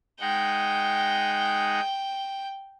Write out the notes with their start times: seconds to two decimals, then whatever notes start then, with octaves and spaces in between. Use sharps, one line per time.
0.20 G#3 D#4 F#5 G5